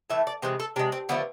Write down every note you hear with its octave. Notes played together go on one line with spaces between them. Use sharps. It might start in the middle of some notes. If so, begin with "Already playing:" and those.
A2 E3 A3 E5
D5
C3 E3 G#3 C5
A4
C3 G#3 D4
C4
D3 F3 A3 B3